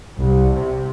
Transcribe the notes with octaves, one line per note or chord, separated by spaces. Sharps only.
C2
C3